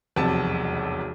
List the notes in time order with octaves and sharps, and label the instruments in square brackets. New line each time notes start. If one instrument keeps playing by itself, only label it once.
[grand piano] E1 B1 F2 C3 A5